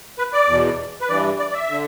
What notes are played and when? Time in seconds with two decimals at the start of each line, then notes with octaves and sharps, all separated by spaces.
0.18 B4
0.33 D5
0.48 E2 B2
1.01 B4
1.09 G2 E3 D5
1.39 D5
1.49 D5
1.54 E5
1.70 D3